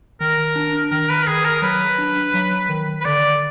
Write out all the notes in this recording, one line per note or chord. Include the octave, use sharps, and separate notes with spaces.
D#3 A#4
D4
D#3 A#4
B4
A#4
D#3 G#4
A#4
F#3 B4
D4
F#3
D#3
B4
D3 D5